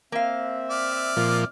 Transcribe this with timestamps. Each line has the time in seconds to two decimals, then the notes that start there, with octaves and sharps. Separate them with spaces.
0.12 A#3 C4 E5 F5
0.70 D5 F6
1.16 A#2 F3